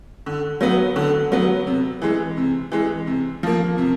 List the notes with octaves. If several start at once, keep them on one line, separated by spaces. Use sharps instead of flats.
D3
F#3 B3
D3
F#3 B3
C3
E3 G#3
C3
E3 G#3
C3
F3 A#3
C3